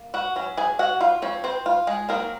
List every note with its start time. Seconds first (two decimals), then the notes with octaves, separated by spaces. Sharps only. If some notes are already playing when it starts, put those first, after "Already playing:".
Already playing: A#3
0.14 F#4 F#5
0.36 F#3 C#4
0.57 G#4 G#5
0.79 F#4 F#5
1.01 F4 F5
1.22 F3 C4 C#5
1.44 C4 C5
1.66 F4
1.87 G#3 G#4
2.09 F#3 A#3 C4 D#4 A#4